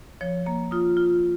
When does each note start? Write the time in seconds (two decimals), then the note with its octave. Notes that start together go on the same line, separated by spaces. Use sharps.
0.21 F3 C#5
0.46 A#3 A#5
0.71 F4 D#6
0.97 F4